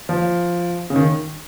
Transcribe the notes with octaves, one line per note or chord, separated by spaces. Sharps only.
F3
C#3
D#3